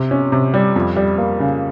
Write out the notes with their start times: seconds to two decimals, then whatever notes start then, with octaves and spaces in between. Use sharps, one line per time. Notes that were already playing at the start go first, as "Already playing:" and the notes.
Already playing: C3
0.11 C#4
0.32 C3
0.54 G3
0.76 F2
0.96 G3
1.18 A#3
1.40 C#3